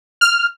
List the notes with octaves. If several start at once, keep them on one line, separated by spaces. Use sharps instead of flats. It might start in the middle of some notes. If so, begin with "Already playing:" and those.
F6